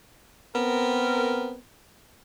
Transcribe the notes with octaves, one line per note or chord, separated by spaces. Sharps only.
B3 C4 A#4